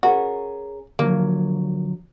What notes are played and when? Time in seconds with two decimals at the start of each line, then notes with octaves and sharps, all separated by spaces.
0.03 C#4 F#4 G#4 A#4
0.99 D3 F3 F#3 A#3